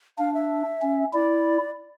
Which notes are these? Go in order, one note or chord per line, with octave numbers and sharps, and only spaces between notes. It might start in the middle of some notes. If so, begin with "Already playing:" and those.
D4 F5
E5
C#4
E4 D5